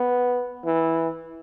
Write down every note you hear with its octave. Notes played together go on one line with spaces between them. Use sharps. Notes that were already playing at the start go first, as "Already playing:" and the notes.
Already playing: B3
E3